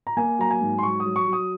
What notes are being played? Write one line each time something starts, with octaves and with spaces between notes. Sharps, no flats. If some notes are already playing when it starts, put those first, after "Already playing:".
A#5
A#3 G#5
F#3 A#5
G#5
G#2
C6
F#3 C#6
D#6
F#3
C#6
F#3
D#6